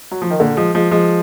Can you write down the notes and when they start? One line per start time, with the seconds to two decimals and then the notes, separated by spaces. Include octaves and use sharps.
0.11 F#3
0.22 F3
0.30 D#3
0.40 A#2 D3
0.57 F3 G#3
0.75 F3 G#3
0.91 F3 G#3